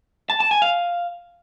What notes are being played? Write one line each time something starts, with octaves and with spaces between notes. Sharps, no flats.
A5
A5
G#5
F5